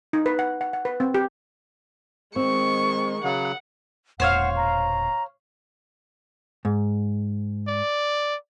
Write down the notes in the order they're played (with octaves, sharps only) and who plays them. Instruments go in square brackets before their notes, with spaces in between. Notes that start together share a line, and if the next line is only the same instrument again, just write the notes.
[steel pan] D#4
B4
F#5
F#5
F#5
B4
C4
G4
[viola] D#3 G#3 [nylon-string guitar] C4 [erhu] C#6
[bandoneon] C#3 F#3 [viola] F#5
[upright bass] E1 A#2 [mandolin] C5 C#5 F5 [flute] F#5
[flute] A#5
[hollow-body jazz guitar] G#2
[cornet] D5